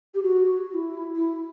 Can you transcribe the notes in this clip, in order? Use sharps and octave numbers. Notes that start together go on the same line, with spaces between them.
G4
F#4
F#4
E4
E4